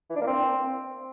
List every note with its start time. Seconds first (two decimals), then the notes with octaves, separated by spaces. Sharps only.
0.10 E3
0.16 D4
0.21 A#3
0.27 C4